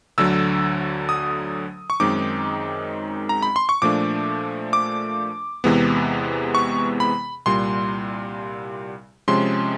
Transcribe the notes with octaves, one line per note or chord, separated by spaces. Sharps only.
D2 D3 F#3 E6
D#6
C#6
F#2 D#3 G#3 C4 D#4 D6
A#5
B5
C6
C#6
A#2 F3 A3 D4 D6
D6
E2 C3 E3 G#3 B3
C#6
B5
C2 A#2 G3 C6
C3 F3 G#3 C#4 C6